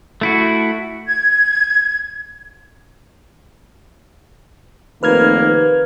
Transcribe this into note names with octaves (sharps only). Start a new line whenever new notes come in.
A3 E4 F#4
G#6
F1 D#3 A#3 B4 F6 G#6